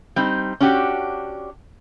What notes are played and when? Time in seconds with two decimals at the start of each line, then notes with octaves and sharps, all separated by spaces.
0.16 G3 C4 D#4
0.60 C#4 D4 F#4 G4